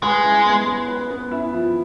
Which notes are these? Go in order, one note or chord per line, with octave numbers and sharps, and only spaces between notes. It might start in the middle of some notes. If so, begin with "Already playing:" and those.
G#3 B4
E4
B3
B4
B4
B3
E4
F3